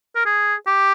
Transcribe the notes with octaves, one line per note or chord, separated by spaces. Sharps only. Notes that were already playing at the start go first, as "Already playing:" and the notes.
A#4
G#4
G4